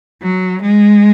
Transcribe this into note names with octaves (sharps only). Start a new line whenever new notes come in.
F#3
G#3